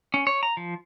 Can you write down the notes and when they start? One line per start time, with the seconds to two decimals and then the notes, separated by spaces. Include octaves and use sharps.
0.14 C#4
0.27 C#5
0.43 A#5
0.57 F3